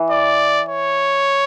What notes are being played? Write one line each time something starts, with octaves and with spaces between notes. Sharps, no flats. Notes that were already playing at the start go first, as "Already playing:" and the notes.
Already playing: E3
D5
C#5